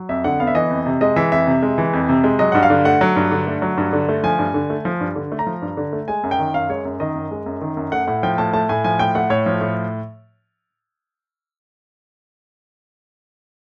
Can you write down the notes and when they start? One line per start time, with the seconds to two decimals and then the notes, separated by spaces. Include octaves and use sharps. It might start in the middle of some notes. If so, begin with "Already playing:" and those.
Already playing: F#3
0.09 F2 E5
0.24 D3 F#5
0.40 B3 F5
0.47 E5
0.55 E3 D#5
0.70 F2
0.86 C3
1.01 G#3 D#5
1.16 E3 E5
1.32 F2 E5
1.47 C3
1.62 G#3
1.78 E3
1.93 F2
2.09 C3
2.24 G#3
2.39 F#3 D#5
2.52 G2 F#5
2.63 F5
2.70 D3
2.85 A3 F#5
3.01 F#3
3.16 G2
3.31 D3
3.47 A3
3.62 F#3
3.78 G2
3.93 D3
4.09 A3
4.23 F3 G#5
4.39 G2
4.54 D3
4.70 A3
4.85 F3
5.01 G2
5.15 D3
5.32 A3
5.39 A#5
5.47 F3
5.62 G2
5.77 D3
5.93 A3
6.08 G#3 G#5
6.23 F#2
6.31 G5
6.39 D#3
6.54 F#2 F5
6.69 G#3 C#5
6.85 F#2
7.00 D#3 D#5
7.15 F#2
7.31 G#3
7.46 F#2
7.61 D#3
7.77 F#2
7.92 A3 F#5
8.07 A2 F#5
8.23 F3 G5
8.38 A2 A5
8.53 A3 A5
8.69 A2 G#5
8.84 F3 G#5
8.99 A2 G5
9.15 A3 F#5
9.30 A2 C#5
9.46 F3
9.61 A2